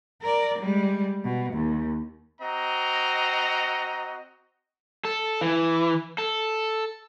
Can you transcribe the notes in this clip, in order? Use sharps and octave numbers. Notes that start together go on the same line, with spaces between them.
A#4 D5
G3 G#3
B2
D#2
C4 F#4 D#5 A#5
A4
E3
A4